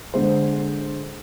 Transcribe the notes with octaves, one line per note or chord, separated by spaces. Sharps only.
D3 G#3 C5